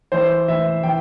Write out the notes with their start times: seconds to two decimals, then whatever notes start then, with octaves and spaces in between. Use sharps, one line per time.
0.12 E3 C5
0.48 E3 E5
0.83 E3 G5